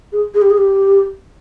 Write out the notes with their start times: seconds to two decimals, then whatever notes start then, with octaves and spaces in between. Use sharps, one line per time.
0.12 G#4
0.34 G#4
0.42 G4
0.50 G#4
0.58 G4